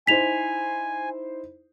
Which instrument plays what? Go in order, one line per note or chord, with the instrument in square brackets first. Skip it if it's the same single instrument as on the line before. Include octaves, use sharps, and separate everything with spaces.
[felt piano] D#4 E4 C5 [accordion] G#5 [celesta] B6 F7